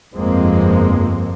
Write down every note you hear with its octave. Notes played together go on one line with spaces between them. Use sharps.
G1 F2 F3 G#3 A#3 C4